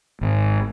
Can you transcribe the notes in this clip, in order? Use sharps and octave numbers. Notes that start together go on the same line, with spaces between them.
G#1